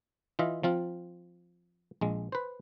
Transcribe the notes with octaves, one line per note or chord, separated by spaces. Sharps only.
E3 F4 D#5 E5
F3 C4 F4
A#1 G#3
B4 C5